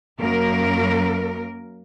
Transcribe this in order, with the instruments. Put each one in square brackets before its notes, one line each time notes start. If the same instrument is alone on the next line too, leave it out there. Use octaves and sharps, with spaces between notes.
[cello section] F#2 A#3 A#4